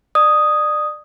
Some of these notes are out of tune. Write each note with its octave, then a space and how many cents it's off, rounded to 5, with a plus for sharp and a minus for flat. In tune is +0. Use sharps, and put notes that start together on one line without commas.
D5 +25 D#6 +0